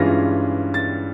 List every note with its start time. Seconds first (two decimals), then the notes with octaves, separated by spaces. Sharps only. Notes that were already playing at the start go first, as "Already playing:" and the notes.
Already playing: G2 E3 G#3 C#4 F4 A#6
0.74 A6